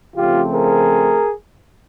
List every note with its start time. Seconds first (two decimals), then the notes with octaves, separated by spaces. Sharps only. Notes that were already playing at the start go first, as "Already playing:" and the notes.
0.16 C#3 F3 A3 C4 F4 G4
0.53 G#4 A#4